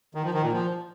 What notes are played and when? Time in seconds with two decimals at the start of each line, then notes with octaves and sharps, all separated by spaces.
0.15 D#3
0.24 F3
0.33 D#3
0.43 A#2
0.52 F3